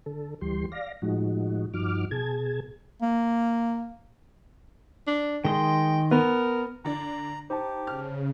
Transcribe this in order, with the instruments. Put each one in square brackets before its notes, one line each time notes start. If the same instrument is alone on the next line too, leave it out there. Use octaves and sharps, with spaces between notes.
[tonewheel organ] D3 A4
D2 E3 G3 G4 C6
D5 F5 A#6
A2 F3 G#3 D#4 F#4
G2 F3 D#4 F#4 D6 F6
B2 G#4 A5 G#6
[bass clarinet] A#3
[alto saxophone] D4
[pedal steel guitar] D#3 D#5 C6 [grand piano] G#3 [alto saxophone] G5
[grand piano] B3 [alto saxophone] A#4
[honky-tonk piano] D3 D4 [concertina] A#5
[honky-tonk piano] D#4 [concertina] G4 [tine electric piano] C5 A5
[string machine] C#3 [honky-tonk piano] F6